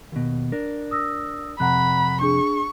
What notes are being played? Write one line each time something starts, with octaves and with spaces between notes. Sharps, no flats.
D#2 B2
D4 A#4
D#6 E6 A#6
F2 C3 F#5 A#5 B5 F#6
D4 G#4 C#6